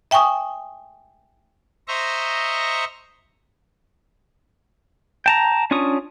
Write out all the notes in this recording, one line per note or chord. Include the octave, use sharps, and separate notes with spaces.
E5 G5 G#5 C#6 D#6
C5 D#5 E5 A#5 C#6
G5 A5 A#5
C#4 D4 F4 C#6 D#6